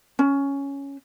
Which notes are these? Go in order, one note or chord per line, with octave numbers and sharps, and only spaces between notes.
C#4